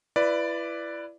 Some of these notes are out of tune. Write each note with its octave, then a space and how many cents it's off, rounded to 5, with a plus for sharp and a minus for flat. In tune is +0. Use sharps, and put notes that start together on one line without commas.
E4 +30 B4 +0 D5 +0